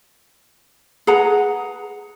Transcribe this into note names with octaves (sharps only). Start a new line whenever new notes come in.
G#4 B4 F#5 A#5